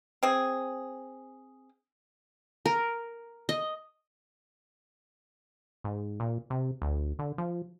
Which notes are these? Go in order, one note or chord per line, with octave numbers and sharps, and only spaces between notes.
C4 G#4
A#4
D#5
G#2
A#2
C3
D2
D3
F3